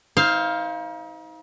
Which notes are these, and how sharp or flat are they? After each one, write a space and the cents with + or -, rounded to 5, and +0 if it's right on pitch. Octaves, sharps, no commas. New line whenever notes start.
D#4 +40 C5 +0 F5 +0